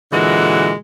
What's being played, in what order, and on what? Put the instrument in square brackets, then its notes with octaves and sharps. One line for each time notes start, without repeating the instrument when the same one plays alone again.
[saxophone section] A#2 D3 E3 G#3 F#4